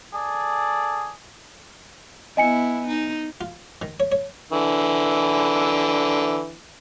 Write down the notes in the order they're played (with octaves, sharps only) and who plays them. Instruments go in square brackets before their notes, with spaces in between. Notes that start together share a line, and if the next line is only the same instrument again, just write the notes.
[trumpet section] G#4 A4 D5
[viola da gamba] B3 E4 [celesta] D#5 G#5 C#7
[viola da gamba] D#4
[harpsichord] F4
D#3
C#5
C#5
[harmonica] D3 E3